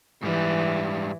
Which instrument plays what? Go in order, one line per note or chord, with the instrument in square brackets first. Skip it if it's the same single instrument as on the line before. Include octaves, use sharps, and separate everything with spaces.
[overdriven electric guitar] G#2 G3 [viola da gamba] E3